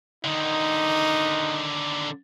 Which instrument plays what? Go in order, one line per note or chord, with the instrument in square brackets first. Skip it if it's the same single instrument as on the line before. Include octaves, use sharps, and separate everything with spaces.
[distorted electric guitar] D3 D#3 [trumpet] D#4